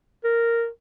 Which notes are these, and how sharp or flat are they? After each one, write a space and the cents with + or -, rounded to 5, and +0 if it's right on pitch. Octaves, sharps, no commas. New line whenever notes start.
A#4 -5